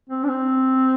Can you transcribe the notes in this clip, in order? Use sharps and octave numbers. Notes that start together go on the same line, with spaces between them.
C4
D4
C4